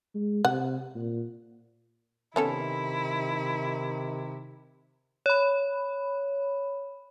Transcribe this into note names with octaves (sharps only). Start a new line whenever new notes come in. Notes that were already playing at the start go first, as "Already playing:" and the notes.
G#3
C3 F#5
A#2
C3 D#3 B3 C#4 E4 A4
C#5 B5